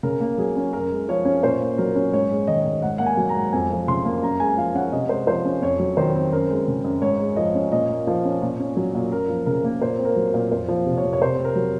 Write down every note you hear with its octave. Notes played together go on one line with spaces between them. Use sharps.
C#3 A#4
A#3
F#3 G#4
C#4
F#2 A#4
G#3
F3 C#5
C#4
A#2 C5
A#3
F#3 A#4
C#4
G#2 C#5
G#3
D#3 D#5
G#2
G#2 F#5
A#3 F#5
G#5
F#3
A#5
G#2
F2 G#5
F3
C#3 C6
A#3
F#2 A#5
G#3 G#5
F3 F5
C#4 F#5
C3 D#5
G#3 C5
F3 C5
C#4
F2 C#5
F#3
D#3 C5
C4
F#2 A#4
G#3 A#4
C#3
F#2
G#2 C#5
G#3
F3 D#5
C#4
A#2 D#5
A#3
F3
C#4
A#2
C#4
F#3
A#2
F#2 A#4
F3
C#3 A#4
A#3
A#2 C5
C4
A#4
F#3
A#4
A#2
F2 C5
F3
C3
C#5
F2
C#5
C3 C5
C4
A#4
F#3